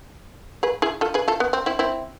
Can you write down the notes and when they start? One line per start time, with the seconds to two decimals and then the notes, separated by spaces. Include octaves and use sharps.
0.63 G#4 B4
0.82 E4 G#4
1.01 F4 A4
1.14 G#4 B4
1.28 F4 A4
1.40 B3
1.53 C4
1.66 C4 E4
1.79 C4 E4